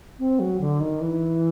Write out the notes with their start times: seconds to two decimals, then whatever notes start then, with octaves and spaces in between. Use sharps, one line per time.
0.19 C4
0.40 F#3
0.60 D3
0.80 D#3
1.01 E3